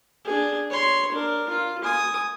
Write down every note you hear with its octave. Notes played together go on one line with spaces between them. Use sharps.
D4 G#4
C#5 C6
D4 A#4
F4
G#5 D#6